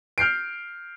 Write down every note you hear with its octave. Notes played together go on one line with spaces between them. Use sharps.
F6 G6 C7 D7